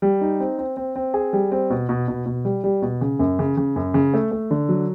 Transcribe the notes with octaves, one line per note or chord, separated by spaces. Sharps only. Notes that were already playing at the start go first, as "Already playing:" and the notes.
G3
D#4
C4
C4
C4
C4
G#4
G3
C4
B2
B2
B2
B2
G3
G3
B2
C#3
F#2
C#3
C#3
F#2
C#3
A3
A3
D3
F#3